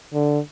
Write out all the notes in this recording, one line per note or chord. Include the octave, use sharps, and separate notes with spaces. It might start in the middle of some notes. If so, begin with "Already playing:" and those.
D3